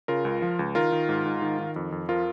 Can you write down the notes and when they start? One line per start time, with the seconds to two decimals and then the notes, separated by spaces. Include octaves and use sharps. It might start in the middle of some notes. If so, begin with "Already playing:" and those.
0.08 C#3 F4 A#4
0.25 C#2
0.42 F3
0.59 C#2
0.75 D#3 F4 A#4
0.92 D#3
1.09 G#2
1.25 G#2
1.42 D#3
1.59 D#3
1.76 F2
1.92 F2
2.09 F3 F4 A#4